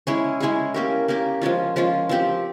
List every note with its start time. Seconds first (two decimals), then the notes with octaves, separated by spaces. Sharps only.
0.07 G#3 C#4 E4 G#4
0.40 G#3 C#4 E4 G#4
0.74 A#3 C#4 G4 A#4
1.08 A#3 C#4 G4 A#4
1.42 F3 G#3 C#4 F4
1.76 F3 G#3 C#4 F4
2.09 F3 C4 G4